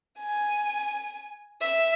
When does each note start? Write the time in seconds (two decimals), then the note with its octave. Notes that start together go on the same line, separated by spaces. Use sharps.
0.19 G#5
1.61 E5